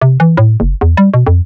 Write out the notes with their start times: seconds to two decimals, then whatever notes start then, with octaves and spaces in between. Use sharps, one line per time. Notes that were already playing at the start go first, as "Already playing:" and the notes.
0.02 C3
0.20 E3
0.37 A2
0.60 F#1
0.81 E2
0.97 G3
1.14 B2
1.27 F2